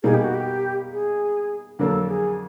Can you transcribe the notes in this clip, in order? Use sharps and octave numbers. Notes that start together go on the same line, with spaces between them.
B2 G3 A#3 D#4 G#4
G4
F#4
G4
G#4
F2 D3 F#3 A#3 A4
G#4